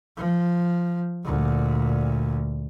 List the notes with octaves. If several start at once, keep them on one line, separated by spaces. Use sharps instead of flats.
F3
D2 A#2